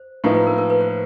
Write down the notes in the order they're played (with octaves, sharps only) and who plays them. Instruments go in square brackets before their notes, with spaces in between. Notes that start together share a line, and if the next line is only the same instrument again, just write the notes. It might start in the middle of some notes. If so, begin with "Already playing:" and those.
Already playing: [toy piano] C5
[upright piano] A2 F3 A#3 D#4 [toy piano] B4
[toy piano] B4
A#4
A#4
B4
C5